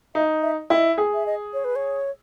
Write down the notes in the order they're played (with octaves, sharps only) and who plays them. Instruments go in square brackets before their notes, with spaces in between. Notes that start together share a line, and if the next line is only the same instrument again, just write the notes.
[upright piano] D#4 [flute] E5
[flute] E5
[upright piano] E4 [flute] D#5
[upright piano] G#4
[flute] E5
D#5
C#5
B4
C#5